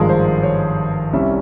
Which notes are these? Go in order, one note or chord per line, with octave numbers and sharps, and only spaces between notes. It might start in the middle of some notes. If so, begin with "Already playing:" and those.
Already playing: G#1 G2 F3 G#3 G#4 A#4
C5
C#5
C2 C3 G3 C#4 E5